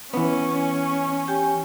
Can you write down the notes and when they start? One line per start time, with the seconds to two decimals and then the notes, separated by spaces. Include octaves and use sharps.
0.14 E3 B3 C#4
1.28 G4 G5 G#5